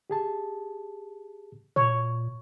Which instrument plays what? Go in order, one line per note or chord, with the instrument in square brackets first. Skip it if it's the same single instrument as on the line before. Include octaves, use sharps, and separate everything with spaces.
[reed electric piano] G4 G#4 A5
[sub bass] A#2 [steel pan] C#5